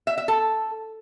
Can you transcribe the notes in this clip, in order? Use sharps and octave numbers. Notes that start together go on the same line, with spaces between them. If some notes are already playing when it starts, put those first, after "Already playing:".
E5
E5
A4